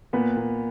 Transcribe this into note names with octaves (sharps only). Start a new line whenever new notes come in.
A#2 B3 B4
A#2